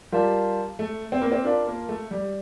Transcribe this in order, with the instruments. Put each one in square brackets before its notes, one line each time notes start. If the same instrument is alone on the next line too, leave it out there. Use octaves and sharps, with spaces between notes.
[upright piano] G3 [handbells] F4 A#4 F5 A5
[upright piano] A3
C4
A#3
C4
[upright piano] D4 [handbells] F4 A#4 F5 A5
[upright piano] A#3
A3
G3